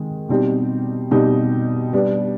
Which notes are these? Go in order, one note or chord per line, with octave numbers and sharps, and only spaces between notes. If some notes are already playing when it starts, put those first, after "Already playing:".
Already playing: D#3 G#3 C4
B2 G3 C4 D#4 G4
B2 G3 C4 D#4 G4
G3 B3 D4